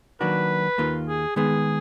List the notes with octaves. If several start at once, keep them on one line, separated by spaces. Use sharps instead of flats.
D#3 F#3 A#3 D4 F#4 B4
D#2 D#3 A#3 F4
G#4
D#3 G#3 B3 G#4